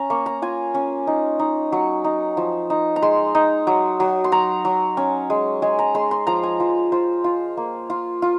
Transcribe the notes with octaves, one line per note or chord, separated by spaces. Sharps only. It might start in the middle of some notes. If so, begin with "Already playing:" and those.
Already playing: C#4 A#5
A#3 C#6
A#5
F4 G#5
C#4
D#4
D#4
F#3 C#6
D#4
F3
D#4
A#5
G#3 C6
D#4
F#3
F#3
C6
F#3 A#5
F#3
C#4
G#3
G#3 G#5
A#5
G#3 C6
C6
F3 A#5
G#5
F3
F4 C5
F4
A#3
F4
F4